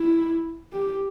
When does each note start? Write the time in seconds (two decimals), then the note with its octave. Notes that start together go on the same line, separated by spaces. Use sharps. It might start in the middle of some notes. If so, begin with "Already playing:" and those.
Already playing: E4
0.73 G4